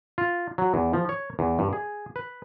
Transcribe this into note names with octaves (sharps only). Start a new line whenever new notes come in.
F4
F#3
E2
F3
C#5
E2
G2
G#4
B4